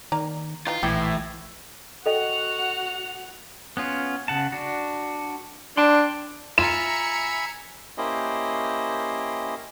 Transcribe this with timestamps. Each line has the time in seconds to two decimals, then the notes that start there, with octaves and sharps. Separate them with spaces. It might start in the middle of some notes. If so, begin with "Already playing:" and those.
0.12 D#3 A#3 D5 A#5
0.67 E3 D#4 F4
0.83 A#1 A2 E3 G4
2.06 F#4 A4 D#5 F#5 G5 F7
3.77 B3 C#4 F4
4.28 C#3 F#5 A5
4.52 D4 F#4
5.77 D4 G5 C6
6.58 F4 E5 G#5 A#5 B5 E6 C#7 E7
7.98 A#3 C#4 E4 G4 C5 D#5